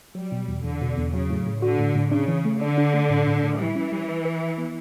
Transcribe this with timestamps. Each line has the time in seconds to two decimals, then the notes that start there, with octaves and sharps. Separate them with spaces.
0.15 F#3 G3
0.32 B2
0.48 E2
0.64 E2 D3
0.81 B2
0.98 E2
1.14 C#3 F#3
1.30 A2
1.47 A2
1.62 D3 F#4
1.80 A2
1.96 A2
2.12 C#3 D4
2.28 E3
2.45 A3
2.61 D3 D4
2.78 D4
2.94 A3
3.10 A2
3.27 A2
3.43 A2
3.59 E3 G3
3.76 C#4
3.92 G3
4.08 B4
4.25 B4
4.41 B4
4.58 B3